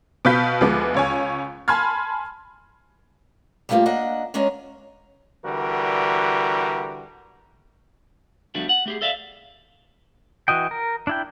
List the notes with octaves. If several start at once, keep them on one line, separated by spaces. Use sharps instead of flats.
B2 B4 F5 G6 B6
D2 F3 G#3 B3 D6
C#2 C#5 G#5
G#5 A5 B5 C6 F6 G#6
G3 A3 A#3 C#4 F4 G4
A#3 D4 D#5 F#5
G#3 C#4 D4 A#4 C#5 D#5
D3 E3 G3 F#4 A#4
F3 G3 A3 B3 D4 F#4
F#5
A3 G4 G#4
A4 D5 E5 F5
E3 F#4 D#5 G5
A#4
D4 E4 G5